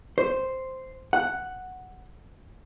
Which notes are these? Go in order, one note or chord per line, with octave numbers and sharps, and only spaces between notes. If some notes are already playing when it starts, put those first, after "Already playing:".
C5
F#5